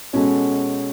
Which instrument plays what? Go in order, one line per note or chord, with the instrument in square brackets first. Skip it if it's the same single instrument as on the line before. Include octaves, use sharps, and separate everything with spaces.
[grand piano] B2 G#3 C#4 F#4 A4